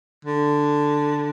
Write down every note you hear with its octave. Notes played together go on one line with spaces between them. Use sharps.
D3